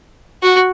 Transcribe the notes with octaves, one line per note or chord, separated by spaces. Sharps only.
F#4